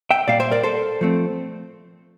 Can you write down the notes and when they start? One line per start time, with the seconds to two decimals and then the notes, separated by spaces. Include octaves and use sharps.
0.11 E5 G5
0.28 A#2 G3 A#3 D5 F5
0.40 C5 E5
0.51 A#4 D5
0.63 A4 C5
1.01 F3 A3 C4